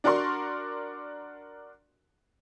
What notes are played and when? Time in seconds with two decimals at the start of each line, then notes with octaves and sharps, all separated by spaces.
0.04 D4 F#4 A#4 D5 C6 C#6